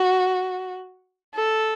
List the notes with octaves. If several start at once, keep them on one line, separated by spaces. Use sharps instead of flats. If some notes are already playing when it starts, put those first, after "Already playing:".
Already playing: F#4
A4